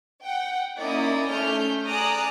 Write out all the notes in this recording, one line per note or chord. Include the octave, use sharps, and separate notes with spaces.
F#5 G5
A#3 C#4 D#4 E4 D5 D#6
A3 C#4 F6 G6
G#4 D5 A#5 D6 D#6 F#6